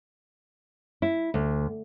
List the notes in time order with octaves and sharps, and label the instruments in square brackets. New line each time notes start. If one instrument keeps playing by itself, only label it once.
[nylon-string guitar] E4
D2